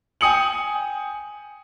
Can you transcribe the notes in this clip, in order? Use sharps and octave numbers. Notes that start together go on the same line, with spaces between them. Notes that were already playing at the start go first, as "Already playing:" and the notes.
G5 G#5 D#6 C#7 F#7